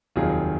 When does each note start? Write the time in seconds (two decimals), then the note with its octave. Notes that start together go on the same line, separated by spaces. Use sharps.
0.16 F1 D#2 D#3 F#3 F4 G#4